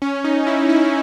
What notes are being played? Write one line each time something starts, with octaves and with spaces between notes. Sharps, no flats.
C#4
D#4
E4
E4